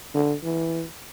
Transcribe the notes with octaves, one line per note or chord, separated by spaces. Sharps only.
D3
E3